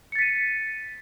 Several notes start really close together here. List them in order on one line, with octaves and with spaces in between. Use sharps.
C#7 A6 B6 D#7